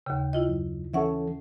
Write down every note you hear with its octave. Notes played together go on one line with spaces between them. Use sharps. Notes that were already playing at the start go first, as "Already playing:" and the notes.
D#2 C#3 G5
E4 F4 D#5
F#2
E3 C#4 A4 E5 F#5 C#6